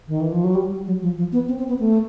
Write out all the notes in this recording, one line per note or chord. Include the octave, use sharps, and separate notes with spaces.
D#3
E3
F3
F#3
G3
G3
F#3
F3
F3
B3
C4
C4
B3
A3